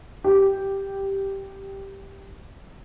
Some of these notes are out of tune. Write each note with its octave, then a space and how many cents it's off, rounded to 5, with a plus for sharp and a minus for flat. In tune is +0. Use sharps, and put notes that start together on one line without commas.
G4 -5